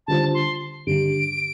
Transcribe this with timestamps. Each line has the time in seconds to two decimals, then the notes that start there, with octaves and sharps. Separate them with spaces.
0.07 D3 G3 F4 C5 A5
0.34 C6
0.87 G2 D3 G3 D7